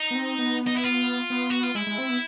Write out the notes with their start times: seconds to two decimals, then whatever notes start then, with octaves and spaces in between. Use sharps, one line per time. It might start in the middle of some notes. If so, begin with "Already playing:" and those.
Already playing: D#4
0.11 B3
0.15 C4
0.38 B3
0.67 D#4
0.75 E4
0.84 F4
1.30 B3
1.50 F#4
1.63 F4
1.75 G#3 E4
1.87 G#3
1.98 C4
2.09 B3